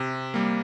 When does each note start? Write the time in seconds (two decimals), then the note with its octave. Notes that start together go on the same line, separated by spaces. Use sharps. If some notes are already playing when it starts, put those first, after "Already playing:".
Already playing: C3
0.34 G3 A#3